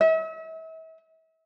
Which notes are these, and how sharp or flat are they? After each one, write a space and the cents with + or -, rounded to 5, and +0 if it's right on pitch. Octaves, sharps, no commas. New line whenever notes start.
E5 -40